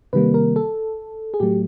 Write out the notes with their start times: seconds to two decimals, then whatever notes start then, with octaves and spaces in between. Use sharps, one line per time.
0.13 C3 D#3 G3 A#3 B4
0.34 A#4
0.56 A4
1.34 G#4
1.40 A2 F#3 A3 G4